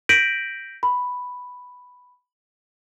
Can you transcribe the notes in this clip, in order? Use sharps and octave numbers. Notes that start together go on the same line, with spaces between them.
G6 A#6 B6 D7 D#7 F#7
B5